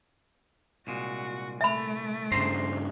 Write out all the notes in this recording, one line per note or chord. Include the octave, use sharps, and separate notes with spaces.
C2 A#2 G#3 F#4
A3 E5 B5
G2 C#3 C5 A#5 C6